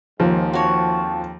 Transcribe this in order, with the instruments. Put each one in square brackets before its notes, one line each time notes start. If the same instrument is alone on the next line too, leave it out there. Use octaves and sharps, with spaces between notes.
[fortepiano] D#2 [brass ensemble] G#2 [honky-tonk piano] F3
[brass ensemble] F2 G5 A5 [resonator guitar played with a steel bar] F#4 C#5